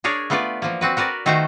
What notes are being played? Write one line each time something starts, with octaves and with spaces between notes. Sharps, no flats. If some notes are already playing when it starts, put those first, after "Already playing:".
D4 G#4 A#4 C#5 D5
A3 B3 F4 B4 D5
E3 F3 A#3
C4 F#4 B4
F#4 A#4 B4 D5
D#3 A3 F4 F#4 C5 A#5